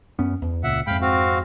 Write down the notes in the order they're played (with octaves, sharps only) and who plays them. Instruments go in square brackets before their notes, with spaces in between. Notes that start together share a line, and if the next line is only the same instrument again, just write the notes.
[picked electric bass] F#2 B3 C#4
E2
[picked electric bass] C#2 A#2 [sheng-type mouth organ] E5 F#5
[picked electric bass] F2 G#2 [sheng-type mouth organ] F5 G5 B5
[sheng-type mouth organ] C4 F#4 F5